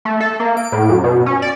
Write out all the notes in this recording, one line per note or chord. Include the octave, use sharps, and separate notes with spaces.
A3
A4
A#3
D7
A2
F#2
B2
C#4
D5